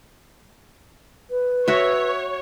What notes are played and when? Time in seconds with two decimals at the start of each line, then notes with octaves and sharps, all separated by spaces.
1.31 B4
1.68 F#4 C#5 E5